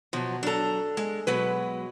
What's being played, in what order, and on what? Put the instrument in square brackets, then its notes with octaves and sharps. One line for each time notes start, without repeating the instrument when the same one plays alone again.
[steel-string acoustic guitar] B2 [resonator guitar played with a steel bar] F3 F#3
[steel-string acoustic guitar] F#3 A#5 [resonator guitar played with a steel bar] D4 A4
[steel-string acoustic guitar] G#3
[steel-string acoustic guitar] B2 F#3 G#3 [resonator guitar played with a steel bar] B4